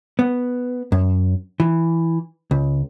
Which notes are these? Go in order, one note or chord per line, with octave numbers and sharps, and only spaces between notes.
B3
F#2
E3
C#2